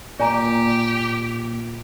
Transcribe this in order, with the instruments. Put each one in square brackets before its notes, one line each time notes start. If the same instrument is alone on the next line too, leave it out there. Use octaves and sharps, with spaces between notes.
[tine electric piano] A#2 [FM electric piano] A#3 [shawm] G4 [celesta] D5 G#5 A#5